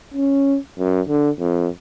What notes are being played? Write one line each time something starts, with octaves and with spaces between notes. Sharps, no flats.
C#4
F#2
D3
F2